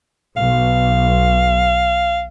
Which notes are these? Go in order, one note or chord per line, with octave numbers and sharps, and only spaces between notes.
B1 F5